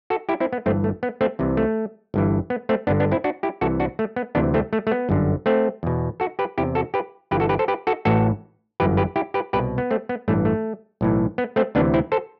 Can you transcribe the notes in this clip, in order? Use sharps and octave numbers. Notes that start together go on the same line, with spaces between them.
F#4 A4
E4 G4
C4 E4
B3
G1 G2 E3 A3 C4
A3
B3
A3 C4
C2 C3 E3
A3
G1 G2 E3
B3
A3 C4
G1 G2 D3 B3 D4
B3 D4
C4 E4
D4 F#4
E4 G4
C2 C3 E3 F#4 A4
D4 F#4
A3
B3
D2 C3 E3 B3 D4
A3 C4
A3
A3
B3
G1 F#2 D3
A3 C4
E2 B2
F#4 A4
G4 B4
E2 C3 E3 E4 G4
F#4 A4
G4 B4
G1 G2 E3 G4 B4
F#4 A4
G4 B4
A4 C5
G4 B4
F#4 A4
A1 A2 E3 F#4 A4
G1 F#2 E3 G4 B4
G4 B4
E4 G4
G4 B4
C2 B2 G4 B4
B3
A3 C4
B3
A1 G2 E3 A3
A3
B1 A2 E3
B3
A3 C4
D2 C3 E3 B3 D4
C4 E4
A4 C5